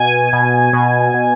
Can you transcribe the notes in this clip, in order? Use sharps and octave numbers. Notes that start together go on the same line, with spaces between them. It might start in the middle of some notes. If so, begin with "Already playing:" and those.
Already playing: B2 G#5
B2
B2
B2